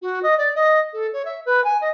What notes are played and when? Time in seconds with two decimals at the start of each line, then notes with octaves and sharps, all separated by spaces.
0.02 F#4
0.23 D#5
0.38 D5
0.55 D#5
0.93 A4
1.13 C#5
1.25 E5
1.45 B4
1.64 G#5
1.81 D#5